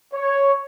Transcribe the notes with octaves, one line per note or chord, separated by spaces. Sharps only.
C#5